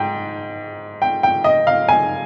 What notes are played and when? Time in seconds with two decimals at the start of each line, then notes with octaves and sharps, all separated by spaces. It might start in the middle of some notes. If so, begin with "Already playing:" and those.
Already playing: G#2 G5
1.02 G5
1.23 G5
1.44 D#5
1.67 F5
1.89 G#5